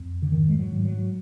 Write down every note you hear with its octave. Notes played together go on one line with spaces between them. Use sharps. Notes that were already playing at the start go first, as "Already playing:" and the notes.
Already playing: F2
D3
G#2 D#3
G#3
F#3
G#2
F#3